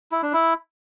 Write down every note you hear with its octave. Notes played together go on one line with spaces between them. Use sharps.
E4
D4
E4